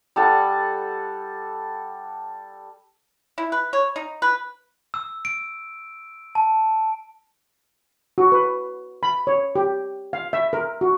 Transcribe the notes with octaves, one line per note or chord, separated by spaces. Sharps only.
G3 A4 F#5 A5
E4
B4
C#5
D#4
B4
E6
D7
A5
F#4
B4
B5
C#5
G4
F5
E5
A#4
F#4